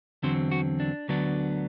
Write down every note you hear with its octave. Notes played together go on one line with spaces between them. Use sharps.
E2 D3 F#3 C4 C5
F#4
D4
D2 D3 F#3 B3 D4